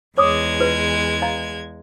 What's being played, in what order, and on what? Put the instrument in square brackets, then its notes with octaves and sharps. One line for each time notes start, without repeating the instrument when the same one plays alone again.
[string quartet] E2 G#3 G#6 [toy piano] C#5 D6 D#6
[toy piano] F4 B4
D#5 F5 A#5